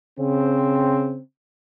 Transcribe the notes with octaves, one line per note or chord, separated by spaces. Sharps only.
C#3 C4